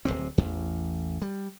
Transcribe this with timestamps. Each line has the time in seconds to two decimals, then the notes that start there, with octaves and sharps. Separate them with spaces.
0.05 D1 G1 C3 C4
0.38 A1 E2
1.22 G3